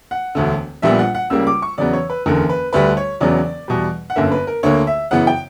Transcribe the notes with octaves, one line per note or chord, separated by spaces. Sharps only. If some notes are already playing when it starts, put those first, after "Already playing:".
F#5
E1 D2 D3
A#1 A#2 G3 B3 E5
F#5
F#5
C#2 C#3 G3 A#3 E6
D6
C#6
E2 C#3 F#3 B3 D5
C#5
B4
F#1 E2 D3 A#4
B4
D2 D3 G3 B4
C#5
E1 E2 C#3 F#3 B3 D5
E2 B2 G3
F#5
G1 F#2 D3 A#3 E5
B4
A#4
D2 D3 A#3 C#5
E5
F#2 C#3 E3 B3 F#5
G5